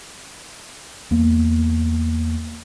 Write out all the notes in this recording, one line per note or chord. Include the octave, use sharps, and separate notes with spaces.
E2 A#3